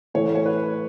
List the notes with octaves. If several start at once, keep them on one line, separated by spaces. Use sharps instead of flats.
A2 E3 A3 C#5
C#5
B4